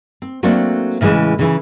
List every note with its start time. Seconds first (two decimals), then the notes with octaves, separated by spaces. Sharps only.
0.22 C4
0.43 F#3 A3 A#3 C4 D4
1.01 A2 C#3 E3 G#3 E4
1.39 C#3 E3 E4